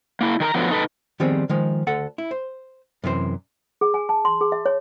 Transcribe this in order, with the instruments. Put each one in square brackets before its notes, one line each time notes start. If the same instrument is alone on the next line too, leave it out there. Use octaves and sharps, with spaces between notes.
[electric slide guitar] A#3 E4
D#3 A#4 A5 A#5
D3 F3 F#3 B3
D#4 A4 B4
[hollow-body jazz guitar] D#3 F3 G3 B3 C4 G#4
D#3 F3 G#3
D2 A4 F#5
E4
C5
F#2 C3 E3 C5
[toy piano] G#4
G#5
A5
C6
G#4
E5
C#5